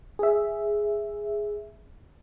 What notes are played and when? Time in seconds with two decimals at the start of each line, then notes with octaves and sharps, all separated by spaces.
0.19 G#4 E5